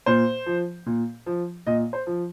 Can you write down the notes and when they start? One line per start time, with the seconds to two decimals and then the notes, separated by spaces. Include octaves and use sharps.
0.06 A#2 C5
0.46 F3
0.86 A#2
1.26 F3
1.67 A#2 D#5
1.93 C5
2.07 F3